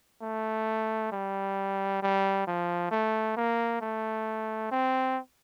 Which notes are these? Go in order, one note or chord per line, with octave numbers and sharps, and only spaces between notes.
A3
G3
G3
F3
A3
A#3
A3
C4